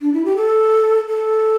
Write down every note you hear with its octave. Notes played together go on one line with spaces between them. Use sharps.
D4
E4
G4
A4
A4